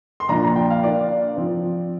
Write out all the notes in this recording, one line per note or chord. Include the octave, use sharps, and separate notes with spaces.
C6
A#2 F3 D4 A#5
A#5
G5
F5
D3 A#3 D4 D5
F3 C4